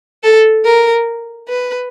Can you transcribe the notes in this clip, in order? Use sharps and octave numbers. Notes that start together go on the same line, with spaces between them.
A4
A#4
B4